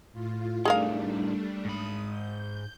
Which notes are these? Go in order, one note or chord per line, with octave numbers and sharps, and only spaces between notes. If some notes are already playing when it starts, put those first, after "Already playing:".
A2 F4
A2 D#3 G3 A3 D4 G#4 A#4 F5
G#2 B5 D#6
G6